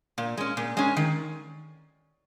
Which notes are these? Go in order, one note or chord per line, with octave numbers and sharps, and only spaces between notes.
A#2
G#3 C#4
A#2
G#3 C#4
D#3